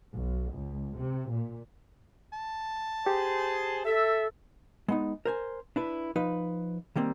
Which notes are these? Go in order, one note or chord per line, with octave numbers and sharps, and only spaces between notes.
B1
C#2
C3
A#2
A5
G4 G#4 C5
A4 E5
G#3 B3 D#4
A#4 C5 G#5
D4 E4 B4
F3 D#4 B4
D#3 G3 A#3 C4